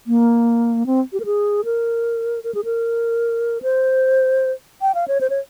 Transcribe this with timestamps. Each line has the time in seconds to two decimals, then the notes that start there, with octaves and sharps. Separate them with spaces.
0.07 A#3
0.86 C4
1.13 G4
1.20 A#4
1.25 G#4
1.65 A#4
2.44 A#4
2.55 G#4
2.64 A#4
3.62 C5
4.82 G5
4.95 F5
5.08 C#5
5.21 C5
5.30 C#5